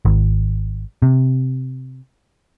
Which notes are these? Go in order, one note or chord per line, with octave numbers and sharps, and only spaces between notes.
G#1
C3